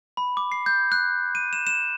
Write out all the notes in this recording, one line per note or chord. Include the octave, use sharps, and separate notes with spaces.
B5
D6
C7
G6
F#6
D#7
E7
E7